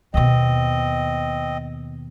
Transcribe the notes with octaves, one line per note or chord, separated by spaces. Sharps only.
D#2 B2 C4 D#5